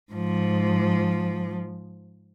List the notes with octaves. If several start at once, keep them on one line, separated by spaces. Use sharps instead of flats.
G#2 F3